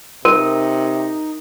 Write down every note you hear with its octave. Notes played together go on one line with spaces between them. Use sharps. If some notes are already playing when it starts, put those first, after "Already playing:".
C3 D#4 A#4